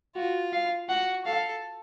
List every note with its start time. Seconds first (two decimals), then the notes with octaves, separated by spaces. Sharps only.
0.16 F4 F#4
0.53 F5
0.89 F#4 F#5
1.25 A4 F5